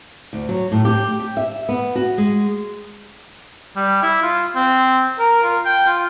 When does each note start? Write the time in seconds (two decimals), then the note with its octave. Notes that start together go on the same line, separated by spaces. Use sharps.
0.33 D2
0.49 F#3
0.72 A2
0.85 G4
1.20 G4
1.37 E5
1.69 B3
1.96 F#4
2.18 G#3
3.76 G3
4.02 E4
4.23 F4
4.56 C4
5.19 A#4
5.43 F4
5.65 G5
5.87 F4